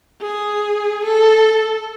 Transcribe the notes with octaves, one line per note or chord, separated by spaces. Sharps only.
G#4
A4